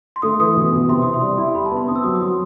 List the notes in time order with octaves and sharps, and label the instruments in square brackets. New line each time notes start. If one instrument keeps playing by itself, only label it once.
[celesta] C6
[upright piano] A3 [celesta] D#6
[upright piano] E3 [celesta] D#6
[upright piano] B2
B2
[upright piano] C3 [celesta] C6
[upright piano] E4 [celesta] D#6
[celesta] C6
[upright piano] G3
E4
[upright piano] G4 [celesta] B5
[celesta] A5
[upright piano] B3
[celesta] C6
[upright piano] C4 [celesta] D#6
[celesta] E6
[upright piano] F#3 [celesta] D#6
[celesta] D#6
[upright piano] F#3 [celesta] C6